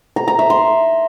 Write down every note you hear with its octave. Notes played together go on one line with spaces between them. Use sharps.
A#5
A#5
E5
C6